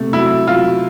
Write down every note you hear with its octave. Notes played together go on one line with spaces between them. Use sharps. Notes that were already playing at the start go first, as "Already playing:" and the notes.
Already playing: C3 A3
F#3 E4
F#3 F4